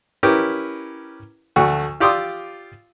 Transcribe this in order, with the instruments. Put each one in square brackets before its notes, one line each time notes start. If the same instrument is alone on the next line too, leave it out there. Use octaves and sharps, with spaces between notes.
[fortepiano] C#4 E4 G4 A#4 B4
D2 A3 F#4
F4 G4 D5 C6 D#6 E6